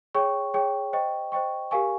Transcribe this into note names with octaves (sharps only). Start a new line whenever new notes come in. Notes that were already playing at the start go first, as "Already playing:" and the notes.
G#4 C#5 G5 C#6
G#4 C#5 G5 C#6
C5 D#5 G5 C#6
C5 D#5 G5 C#6
G4 A#4 F5 G#5 C#6